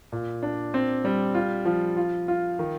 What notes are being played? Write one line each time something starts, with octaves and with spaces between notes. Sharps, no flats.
A#2
D4
C4
G3
F4
F3
F4
F4
D#3